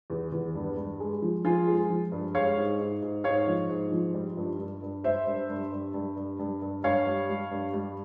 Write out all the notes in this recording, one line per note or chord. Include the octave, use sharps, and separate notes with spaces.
E2
E2
G2
G2
G#3
F3
F3 F4 G#4
G#3
F3
G2
G#3 C#5 F5
G#2
G#2
G#2
G#2 C#5 F5
F3
G#2
F3
G3
G2
G2
G2
G3 C5 E5
G2
G2
G2
G2
G2
G2
G2
G2 C#5 F5
G3
G3
G2
G3